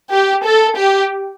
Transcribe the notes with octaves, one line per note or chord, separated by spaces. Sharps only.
G4
A4
G4